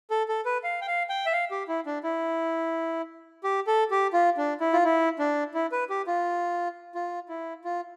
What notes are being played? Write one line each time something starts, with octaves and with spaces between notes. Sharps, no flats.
A4
A4
B4
F5
G5
F5
G5
E5
F5
G4
E4
D4
E4
G4
A4
G4
F4
D4
E4
F4
E4
D4
E4
B4
G4
F4
F4
E4
F4